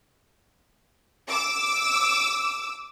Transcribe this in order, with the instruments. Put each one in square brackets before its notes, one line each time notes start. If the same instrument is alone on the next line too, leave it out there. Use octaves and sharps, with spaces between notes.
[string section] D6 E6